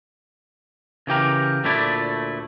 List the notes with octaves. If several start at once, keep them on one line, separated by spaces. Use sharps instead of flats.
C#3 E3 G4 A#4
D2 A#2 A3 E4 D5